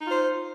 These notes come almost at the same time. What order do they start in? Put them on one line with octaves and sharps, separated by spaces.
D#4 F4 C5